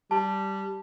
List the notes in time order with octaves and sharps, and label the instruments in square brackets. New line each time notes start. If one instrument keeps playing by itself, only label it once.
[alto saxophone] G3 [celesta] A5